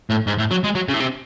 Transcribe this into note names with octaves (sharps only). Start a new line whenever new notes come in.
A2
G#2
A2
F#3
G#3
F#3
C#3
A2
C3